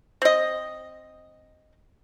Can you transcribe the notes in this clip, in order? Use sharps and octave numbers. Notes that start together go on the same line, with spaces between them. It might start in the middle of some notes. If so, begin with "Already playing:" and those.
C4 D#5